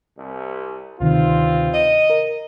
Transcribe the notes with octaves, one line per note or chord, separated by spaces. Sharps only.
C2
D2 G2 C3 D#3 C4 F4
D#5
A#4